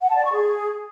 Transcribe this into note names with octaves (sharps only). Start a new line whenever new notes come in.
F#5
A5
D5
C#6
G#4